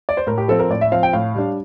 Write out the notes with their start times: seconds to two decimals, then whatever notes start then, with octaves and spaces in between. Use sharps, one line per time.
0.09 D5
0.17 C5
0.27 A2 A#4
0.38 G4
0.48 F3 C4 A4
0.59 A#4
0.70 A2 D5
0.81 E5
0.92 F3 C4 F5
1.03 G5
1.13 A2 F5
1.35 G3 D4